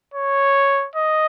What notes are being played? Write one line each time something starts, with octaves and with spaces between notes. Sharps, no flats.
C#5
D#5